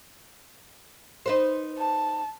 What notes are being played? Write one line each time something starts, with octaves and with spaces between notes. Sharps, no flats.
D#4 B4 C5
A5